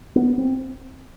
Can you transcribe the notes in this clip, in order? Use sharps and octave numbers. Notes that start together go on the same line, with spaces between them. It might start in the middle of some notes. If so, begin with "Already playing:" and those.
B3
C4